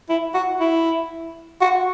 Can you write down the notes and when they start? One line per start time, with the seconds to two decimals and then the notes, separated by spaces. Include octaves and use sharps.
0.09 E4
0.34 F#4
0.60 E4
1.61 F#4